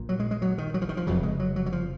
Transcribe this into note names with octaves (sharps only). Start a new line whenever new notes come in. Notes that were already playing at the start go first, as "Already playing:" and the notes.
Already playing: A#1 A#2
F#3
G#3
G#3
F#3
D#3
F#3
F3
D#3
F3
F1 F2 C#3 F#3
G#3
F#3
F#3
F#3
F3